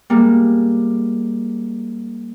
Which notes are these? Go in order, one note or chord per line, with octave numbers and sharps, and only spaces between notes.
G3 G#3 A#3